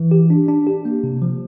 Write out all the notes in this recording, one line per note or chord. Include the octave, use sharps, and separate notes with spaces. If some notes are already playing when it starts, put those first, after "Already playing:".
Already playing: E3
G4
D4
D4
G4
A#3
C3
F3